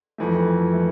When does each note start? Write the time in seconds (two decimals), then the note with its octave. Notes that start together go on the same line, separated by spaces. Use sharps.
0.18 F2 E3 A3
0.73 E3 A3